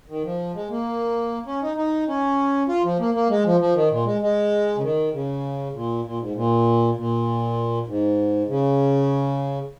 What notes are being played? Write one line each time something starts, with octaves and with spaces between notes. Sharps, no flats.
D#3
F3
G#3
A#3
C#4
D#4
D#4
C#4
F4
F3
A#3
A#3
G#3
F3
F3
D#3
A#2
G#3
G#3
C#3
D#3
C#3
A#2
A#2
G#2
A#2
A#2
G#2
C#3